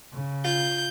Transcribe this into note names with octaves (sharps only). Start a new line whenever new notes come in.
C#3
F4 G6